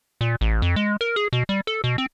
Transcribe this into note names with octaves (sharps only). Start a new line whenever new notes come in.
A#2
A1
F2
G#3
A#4
G#4
B2
G3
A4
B2
C4